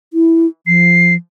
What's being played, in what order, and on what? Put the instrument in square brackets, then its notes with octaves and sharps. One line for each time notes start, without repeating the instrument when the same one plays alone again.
[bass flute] E4
[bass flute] F3 [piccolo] C7